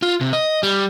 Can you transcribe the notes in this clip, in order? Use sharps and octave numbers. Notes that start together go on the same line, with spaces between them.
F4
C3
D#5
G3